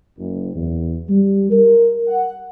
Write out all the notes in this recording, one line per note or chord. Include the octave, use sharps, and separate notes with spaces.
F#1
E2
G3
A#4
F#5